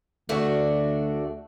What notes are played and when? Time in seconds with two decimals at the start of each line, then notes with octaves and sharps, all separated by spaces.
0.29 D2 A3 D4 F#4